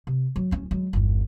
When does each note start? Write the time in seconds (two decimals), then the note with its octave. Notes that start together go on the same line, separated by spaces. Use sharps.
0.07 C3
0.36 F#3
0.51 D1 C#4
0.71 F#3 G#3
0.93 G1 E2